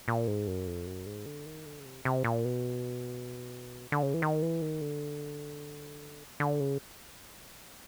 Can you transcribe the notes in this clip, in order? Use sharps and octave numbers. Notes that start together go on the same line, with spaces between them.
A#2
G#2
F#2
F2
F#2
G#2
D3
D#3
D3
C#3
C3
C3
A#2
B2
D3
C#3
E3
D#3
E3
D#3
D3
D3
C#3